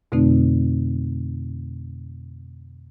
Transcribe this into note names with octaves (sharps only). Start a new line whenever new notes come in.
F2 B2 D3 A3 C4 D#4